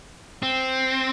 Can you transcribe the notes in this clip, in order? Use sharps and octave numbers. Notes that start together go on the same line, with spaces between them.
C4